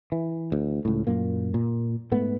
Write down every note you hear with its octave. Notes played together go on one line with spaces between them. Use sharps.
E3
D2
C#2 A2
F#2 A#2 A#3
A#2
G#2 A3 B3